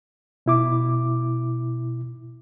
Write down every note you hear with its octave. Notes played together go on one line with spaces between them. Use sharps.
B2 E4 D6